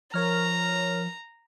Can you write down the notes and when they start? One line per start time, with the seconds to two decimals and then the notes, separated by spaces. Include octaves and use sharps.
0.14 F3 A#4 C#5 A#5 F6